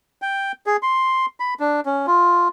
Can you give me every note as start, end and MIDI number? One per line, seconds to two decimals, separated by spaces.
0.22 0.52 79
0.66 0.77 68
0.83 1.26 84
1.40 1.54 83
1.60 1.80 62
1.86 2.06 61
2.07 2.48 65